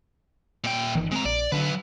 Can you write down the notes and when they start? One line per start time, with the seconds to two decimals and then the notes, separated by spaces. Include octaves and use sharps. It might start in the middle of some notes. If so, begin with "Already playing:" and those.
0.64 A#2 G5
0.95 G1 D#3 E3
1.11 G#3 C4 A#5
1.25 A#1 D5
1.52 D3 F#3 D4 B4